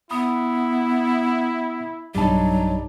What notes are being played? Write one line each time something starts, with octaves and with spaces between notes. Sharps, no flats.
B3 E4 B5 D#6
B1 G2 F#3 G3 D#4 A5